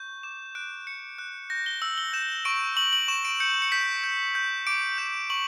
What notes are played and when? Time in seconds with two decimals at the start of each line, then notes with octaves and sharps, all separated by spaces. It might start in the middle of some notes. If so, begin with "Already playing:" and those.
Already playing: C#6 G6
0.23 D6 E7
0.55 F#6 D7
0.87 F#6 C#7
1.19 F#6
1.50 G6 A#6
1.66 G7
1.81 E6 F#7
1.98 G7
2.13 G6 E7
2.45 C#6 D7
2.77 C#6 F#7
2.93 F#7
3.08 C#6 E7
3.25 D7
3.40 G6 C#7
3.62 C#7
3.72 G6 B6
4.04 G6
4.35 G6
4.67 D6 D7
4.98 G6 E7
5.30 C#6 F#7